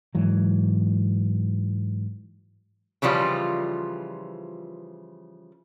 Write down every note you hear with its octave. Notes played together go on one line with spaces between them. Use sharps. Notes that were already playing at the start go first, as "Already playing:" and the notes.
G#2 E3 F#3
C#3 E3 F3 G3 F4